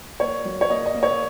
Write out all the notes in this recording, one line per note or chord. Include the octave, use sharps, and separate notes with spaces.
A#3 C#5
F#3
C#5
A#3 D#5
D#5
A#3
C#5